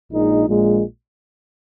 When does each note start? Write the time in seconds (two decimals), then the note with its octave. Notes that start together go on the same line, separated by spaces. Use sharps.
0.11 A#1 A#2 G#3 D#4
0.47 A#1 A#2 G#3